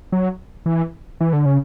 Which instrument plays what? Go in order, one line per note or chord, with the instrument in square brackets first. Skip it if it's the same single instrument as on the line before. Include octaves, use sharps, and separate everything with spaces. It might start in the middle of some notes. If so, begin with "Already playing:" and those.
[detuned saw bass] F#3
E3
E3
D3
C#3